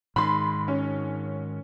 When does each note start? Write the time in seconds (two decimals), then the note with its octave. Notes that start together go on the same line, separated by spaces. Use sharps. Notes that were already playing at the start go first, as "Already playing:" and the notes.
0.16 G#2 D#3 B5 C6
0.68 C#4